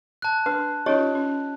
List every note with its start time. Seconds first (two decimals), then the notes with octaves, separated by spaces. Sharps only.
0.22 A5 F#6
0.46 D4 B4
0.86 C#4 D#4 F4 G4 C#5 D#5
1.15 C#4